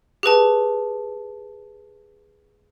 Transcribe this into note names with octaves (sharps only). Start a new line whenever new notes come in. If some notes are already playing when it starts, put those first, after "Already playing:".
G4 G#4 B4 A5